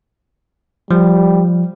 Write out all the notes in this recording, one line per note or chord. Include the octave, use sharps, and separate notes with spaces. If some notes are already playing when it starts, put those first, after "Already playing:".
F3 G3